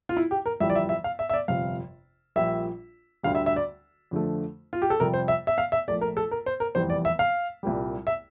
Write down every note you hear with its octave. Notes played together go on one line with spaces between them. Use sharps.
F4
E4
G4
A#4
G1 F2 E3 G3 E5
D5
E5
E5
F5
E5
E5
D5
G1 F2 C3 F5
A#1 A#2 G3 E5
D2 D3 G3 F5
E5
E5
D5
F2 D3 F3 A3
F4
G4
A4
F2 C3 G3 A#4
C5
E5
E5
F5
E5
A#1 A#2 A3 D5
A#4
A4
A#4
C5
A#4
F1 E2 E3 G3 C5
D5
E5
F5
C2 A#2 G3
E5